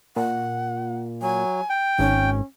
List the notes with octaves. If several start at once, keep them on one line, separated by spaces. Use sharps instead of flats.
A#2 F#5
F#3 G#5
G5
G#1 C#4